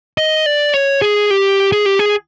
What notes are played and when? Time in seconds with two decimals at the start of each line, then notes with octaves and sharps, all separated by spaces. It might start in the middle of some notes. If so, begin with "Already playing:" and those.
0.18 D#5
0.46 D5
0.74 C#5
1.02 G#4
1.31 G4
1.72 G#4
1.86 G4
1.99 G#4